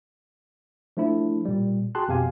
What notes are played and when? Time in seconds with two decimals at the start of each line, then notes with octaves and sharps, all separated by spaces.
0.97 F3 A3 D4 E4
1.45 A#2 G3
1.95 F#4 G#4 G5 A5 C6 F#6
2.08 F2 B2 G4 F5 G#5